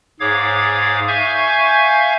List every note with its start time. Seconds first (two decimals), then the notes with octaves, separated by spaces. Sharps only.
0.20 G#2 G#4 C#5 F5 D6 G#6
1.08 E5 F5 G#5 C#6 G6 G#6